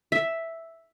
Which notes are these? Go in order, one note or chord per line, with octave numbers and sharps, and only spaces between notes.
E5